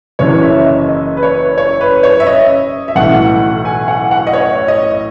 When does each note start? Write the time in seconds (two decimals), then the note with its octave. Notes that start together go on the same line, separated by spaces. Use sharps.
0.19 F#1 F#2 C#3 E3 C#5
0.43 E5
0.65 D#5
0.88 D#5
1.17 B4
1.23 C#5
1.58 C#5
1.81 B4
2.03 C#5
2.20 E5
2.27 D#5
2.88 E5
2.95 B1 A2 E3 F#5
3.65 G#5
3.88 F#5
4.11 F#5
4.27 D#5
4.33 C#5
4.68 D#5